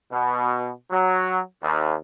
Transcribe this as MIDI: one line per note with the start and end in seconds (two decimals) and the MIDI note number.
0.11 0.68 47
0.91 1.39 54
1.62 1.94 39